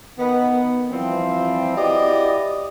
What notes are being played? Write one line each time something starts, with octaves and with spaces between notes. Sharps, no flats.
D#3 B3
E3 F3 G3 C4
E4 F#4 G4 B4 D5 D#5